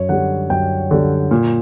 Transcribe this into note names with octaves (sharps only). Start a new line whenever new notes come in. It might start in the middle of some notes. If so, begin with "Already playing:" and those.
Already playing: F#2 C#5
D3 G3 F#5
F#2 G5
D3 G3
A#2